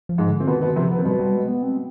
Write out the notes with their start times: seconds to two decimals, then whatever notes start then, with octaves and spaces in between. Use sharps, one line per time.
0.09 F3
0.18 G#2 G#3
0.29 D3
0.40 C4
0.47 B2 D#3 B3
0.61 B2 B3
0.76 C3 F3 C4
0.91 B3
0.98 C4
1.05 B2 G3 B3
1.20 G3
1.34 G#3
1.48 B3
1.63 C4